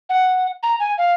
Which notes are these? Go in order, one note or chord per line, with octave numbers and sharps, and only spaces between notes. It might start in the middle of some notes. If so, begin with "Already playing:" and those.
F#5
A#5
G#5
F5